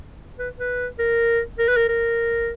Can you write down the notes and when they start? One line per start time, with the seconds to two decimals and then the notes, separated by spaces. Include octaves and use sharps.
0.39 B4
0.59 B4
0.99 A#4
1.59 A#4
1.68 B4
1.77 A#4
1.89 A#4